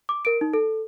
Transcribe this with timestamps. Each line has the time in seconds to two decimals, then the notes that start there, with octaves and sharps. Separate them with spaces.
0.09 D6
0.25 A#4 D7
0.41 D#4
0.53 A4